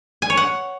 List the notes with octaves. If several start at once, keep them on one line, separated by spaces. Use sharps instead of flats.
G#5
C#5
F#5